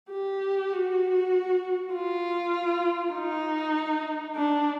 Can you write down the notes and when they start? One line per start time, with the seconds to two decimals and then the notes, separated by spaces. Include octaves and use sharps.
0.11 G4
0.73 F#4
1.93 F4
3.13 D#4
4.35 D4